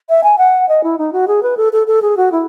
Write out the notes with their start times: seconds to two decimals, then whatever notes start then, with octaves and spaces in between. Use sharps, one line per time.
0.09 E5
0.24 G#5
0.38 F#5
0.69 D#5
0.84 E4
0.98 D#4
1.13 F#4
1.28 G#4
1.43 B4
1.57 A4
1.73 A4
1.87 A4
2.02 G#4
2.17 F#4
2.32 E4